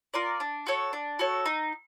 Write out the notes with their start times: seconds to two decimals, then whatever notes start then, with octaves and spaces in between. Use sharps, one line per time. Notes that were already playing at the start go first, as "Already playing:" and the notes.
0.14 F4 A#4 D5
0.40 D4
0.67 F#4 A4 C#5
0.93 D4
1.19 F#4 A4 C#5
1.46 D#4